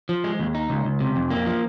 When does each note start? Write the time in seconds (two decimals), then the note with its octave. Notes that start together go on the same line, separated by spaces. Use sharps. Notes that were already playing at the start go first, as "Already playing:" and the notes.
0.09 F3
0.24 G#3
0.39 D#2
0.55 D#4
0.70 C#2
0.85 C#2
1.00 C3
1.16 F2
1.30 A#3
1.46 F3